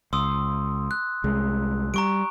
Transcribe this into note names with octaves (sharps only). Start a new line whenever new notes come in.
C#2 C6 D#6 E6
F#6
C2 G#3
G3 A#5 C#6 D7